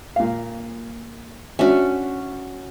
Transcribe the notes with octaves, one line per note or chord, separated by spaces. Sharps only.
A#2 F5
C#4 D4 F#4 E5